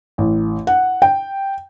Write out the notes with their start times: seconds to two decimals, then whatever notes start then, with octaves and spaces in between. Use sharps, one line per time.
0.18 A1
0.67 F#5
1.02 G5